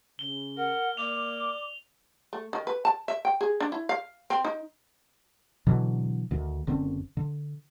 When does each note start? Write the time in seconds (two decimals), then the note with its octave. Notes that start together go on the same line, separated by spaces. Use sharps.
0.19 C#3 G7
0.57 A#4 F#5
0.97 A#3 D5 D6 F7
2.33 A3
2.53 D#3
2.67 B4
2.85 A5
3.08 E5
3.25 G5
3.41 G#4
3.60 D4
3.72 E4
3.89 F5
4.30 C4
4.45 D#4
5.67 B2 D3 E3 F#3
6.31 D2 D#3
6.67 F#1 D3 C4 C#4
7.17 D3